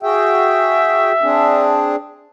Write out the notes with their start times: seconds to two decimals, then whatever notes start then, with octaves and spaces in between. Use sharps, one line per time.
0.03 F#4 G#4 E5 G5
1.22 C4 D4 G#4